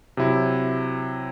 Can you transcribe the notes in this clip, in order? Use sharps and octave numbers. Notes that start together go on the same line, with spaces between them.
C3 F#3 E4